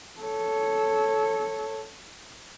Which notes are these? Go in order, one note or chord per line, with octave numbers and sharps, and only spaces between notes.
A4 C#5